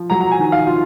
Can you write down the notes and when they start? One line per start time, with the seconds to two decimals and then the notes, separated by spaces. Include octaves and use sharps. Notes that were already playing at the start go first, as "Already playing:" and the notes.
Already playing: F3
0.10 F#3 A#5
0.21 A#5
0.31 G#5
0.39 D#3
0.52 F5
0.67 F4